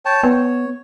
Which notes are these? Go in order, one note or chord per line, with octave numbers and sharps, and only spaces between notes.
C#5 G5 A5
B3 C#5